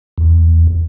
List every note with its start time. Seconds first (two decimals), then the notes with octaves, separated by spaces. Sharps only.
0.18 E2